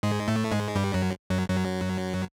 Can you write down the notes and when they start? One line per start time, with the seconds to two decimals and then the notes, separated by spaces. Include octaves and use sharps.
0.03 G#2 G#3
0.28 A2 A3
0.51 G#2 G#3
0.76 G2 G3
0.94 F#2 F#3
1.30 F#2 F#3
1.48 F#2 F#3